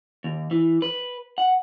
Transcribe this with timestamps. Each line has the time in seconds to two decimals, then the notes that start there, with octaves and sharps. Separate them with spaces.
0.24 D#2
0.51 E3
0.82 B4
1.38 F#5